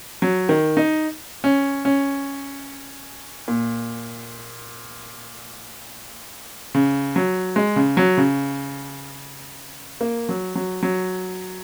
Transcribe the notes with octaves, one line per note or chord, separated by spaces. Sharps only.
F#3
D#3
D#4
C#4
C#4
A#2
C#3
F#3
G#3
C#3
F#3
C#3
A#3
F#3
F#3
F#3